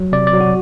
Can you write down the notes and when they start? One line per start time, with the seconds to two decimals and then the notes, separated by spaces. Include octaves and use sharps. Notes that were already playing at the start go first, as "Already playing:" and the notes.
Already playing: F#3
0.12 C3 D5
0.27 D5
0.33 F#3
0.41 F#4